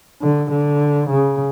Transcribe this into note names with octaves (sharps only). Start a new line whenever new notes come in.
D3
D3
C#3